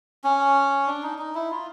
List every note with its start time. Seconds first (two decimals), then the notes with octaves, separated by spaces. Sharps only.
0.24 C#4
0.87 D4
1.03 D#4
1.18 D#4
1.35 E4
1.51 F4